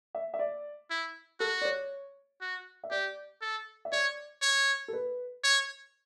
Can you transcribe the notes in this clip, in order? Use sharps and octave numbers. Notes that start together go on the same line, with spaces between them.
E5
E5
D5
E4
F#4 A4
D5
C#5
F#4
E5
G4 D5
A4
E5
C#5 D5
C#5
A4
B4
C#5